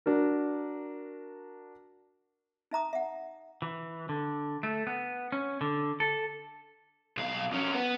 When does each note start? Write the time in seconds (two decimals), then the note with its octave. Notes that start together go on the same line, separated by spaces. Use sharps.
0.06 D4 F#4 A#4
2.71 D#4 E5 A#5 D#6
2.93 E5 F#5
3.62 E3
4.09 D3
4.63 A3
4.87 B3
5.32 C#4
5.61 D3
6.00 A4
7.17 B1 F5
7.51 F2 C#4
7.74 B3